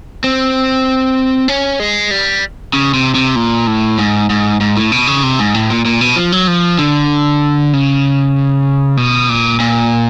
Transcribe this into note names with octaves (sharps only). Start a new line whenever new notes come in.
C4
C#4
G#3
G3
C#3
C3
C3
A#2
A2
G#2
G#2
G#2
A2
B2
C#3
C3
G#2
A2
A#2
A#2
B2
F3
F#3
F3
D3
C#3
B2
A#2
A#2